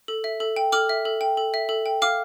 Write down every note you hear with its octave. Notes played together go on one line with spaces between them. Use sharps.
A4
E5
A4
G5
A4 D6 F6
E5
A4
G5
A4
E5
A4
G5
F5 D6 F6